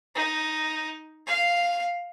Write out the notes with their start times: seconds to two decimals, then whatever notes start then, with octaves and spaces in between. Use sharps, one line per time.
0.15 D#4
1.27 F5